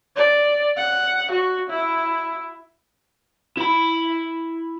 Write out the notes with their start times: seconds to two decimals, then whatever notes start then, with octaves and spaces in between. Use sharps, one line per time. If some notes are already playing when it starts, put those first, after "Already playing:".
0.16 D5
0.76 F#5
1.31 F#4
1.69 E4
3.57 E4 B5